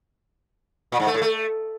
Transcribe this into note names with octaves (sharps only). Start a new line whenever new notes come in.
A#2
G#2
A3
A2
A3